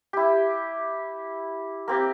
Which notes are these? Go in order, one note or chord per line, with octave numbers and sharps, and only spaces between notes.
E4 G4
A#3 C4 G4